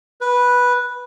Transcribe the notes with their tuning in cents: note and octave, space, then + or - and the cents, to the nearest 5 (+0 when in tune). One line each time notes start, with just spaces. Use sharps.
B4 -10